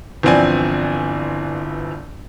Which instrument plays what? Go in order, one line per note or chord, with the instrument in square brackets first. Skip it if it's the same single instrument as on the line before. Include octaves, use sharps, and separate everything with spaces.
[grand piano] G1 E3 F3 C4 D5 G#5